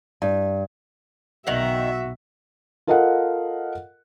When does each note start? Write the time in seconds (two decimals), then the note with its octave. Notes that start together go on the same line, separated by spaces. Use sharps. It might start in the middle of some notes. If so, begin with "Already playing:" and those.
0.22 G2
1.47 B1 D#3 F#4 E5 F#5
2.87 F4 A4 A#4 D#5 F5 F#5